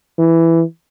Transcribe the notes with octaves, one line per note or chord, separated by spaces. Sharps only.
E3